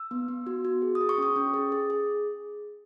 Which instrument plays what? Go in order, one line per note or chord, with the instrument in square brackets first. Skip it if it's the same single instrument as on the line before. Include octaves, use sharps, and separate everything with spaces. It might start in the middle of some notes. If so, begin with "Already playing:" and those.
Already playing: [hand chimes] E6
B3
B3
F#4
F#4
G#4
D#6
G#4
C#6
C#4 D#6
C#4
G#4
G#4
G#4